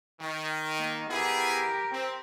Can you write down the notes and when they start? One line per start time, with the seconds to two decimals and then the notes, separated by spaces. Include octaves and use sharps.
0.20 D#3
0.78 A#3
1.10 B3 E4 G4 G#4 A#4
1.92 C4